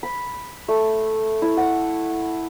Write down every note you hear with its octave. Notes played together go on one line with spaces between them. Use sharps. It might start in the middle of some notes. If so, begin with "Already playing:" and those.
B5
A3
E4
F#5